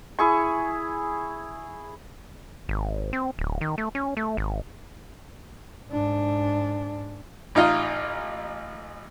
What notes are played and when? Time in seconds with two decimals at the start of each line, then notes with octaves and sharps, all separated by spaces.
0.19 E4 G#4 C#6
2.69 G#1
3.13 C4
3.39 D1
3.61 D#3
3.78 A3
3.95 C#4
4.17 A3
4.37 G#1
5.92 G#2 D4
7.55 A1 D#4 F4 D#5